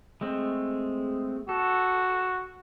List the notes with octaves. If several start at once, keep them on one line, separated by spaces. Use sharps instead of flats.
G#3 A3 C4
F#4 A4